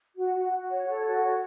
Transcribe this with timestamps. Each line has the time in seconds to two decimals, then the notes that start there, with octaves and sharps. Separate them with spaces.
0.17 F#4
0.34 F#4
0.52 F#4
0.70 C#5
0.88 A4
1.05 F#4
1.23 C#5